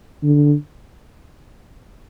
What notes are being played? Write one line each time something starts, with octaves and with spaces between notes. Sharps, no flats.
D3